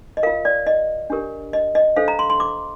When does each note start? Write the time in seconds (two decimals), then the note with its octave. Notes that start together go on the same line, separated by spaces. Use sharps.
0.17 D#5
0.23 F4 A#4 F5
0.45 D5
0.66 D#5
1.10 D4 G4 A#4
1.53 D#5
1.75 D#5
1.96 D4 A4 C5 F5
2.08 A#5
2.19 C6
2.30 C6
2.40 D6